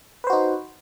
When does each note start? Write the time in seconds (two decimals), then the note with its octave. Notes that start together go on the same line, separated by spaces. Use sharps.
0.24 B4
0.27 C5
0.30 F#4
0.33 D#4